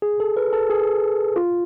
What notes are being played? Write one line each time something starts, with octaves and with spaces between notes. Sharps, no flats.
G#4
A4
B4
A4
G#4
F4